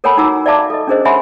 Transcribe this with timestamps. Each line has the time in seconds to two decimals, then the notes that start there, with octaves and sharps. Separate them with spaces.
0.04 A4 A#4 C#5 F#5 G#5 B5
0.17 D#4 F#4 F#5 A#5 D6 E6
0.46 D5 E5 F5 A5 D6
0.70 A4 D#5
0.87 C#4 D4 G#4 A#4 C5 D#5
1.05 C#5 E5 F#5 G#5 B5 C6